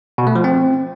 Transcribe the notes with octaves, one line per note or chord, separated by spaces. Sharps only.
B2
A3
F3
C4